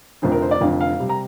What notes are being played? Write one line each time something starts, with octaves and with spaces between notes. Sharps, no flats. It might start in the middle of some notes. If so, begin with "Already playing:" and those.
F1 F2 D3 C5
A#4
C5
D5
F1 F2 D3 F5
F5
C3 G3
A#5